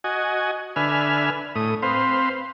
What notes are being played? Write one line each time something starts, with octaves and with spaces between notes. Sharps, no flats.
F#4 D#5 G#5
D3 B4 E5 G#5 F6
A2 D#6
C4 B4 C5 F5